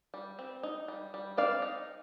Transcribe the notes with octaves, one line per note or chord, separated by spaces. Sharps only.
G3
C4
D#4
G3
G3
C4 D5 F5
D#4